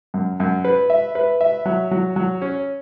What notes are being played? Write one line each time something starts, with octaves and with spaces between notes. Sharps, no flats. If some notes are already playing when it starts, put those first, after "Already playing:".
F#2
F#2
B4
E5
B4
E5
F#3
F#3
F#3
C#4